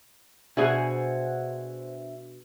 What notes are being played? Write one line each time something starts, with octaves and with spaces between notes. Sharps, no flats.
B2 D4 G#4 C5 E5 F#5 G#5